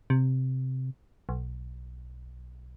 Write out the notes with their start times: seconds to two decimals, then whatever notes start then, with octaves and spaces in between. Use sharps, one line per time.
0.10 C3
1.29 B1